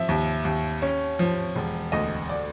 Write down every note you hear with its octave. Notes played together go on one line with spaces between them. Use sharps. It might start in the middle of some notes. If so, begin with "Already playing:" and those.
Already playing: F3 E5
D#2
D#2
C#4
F3
E1
D2 D#5
D5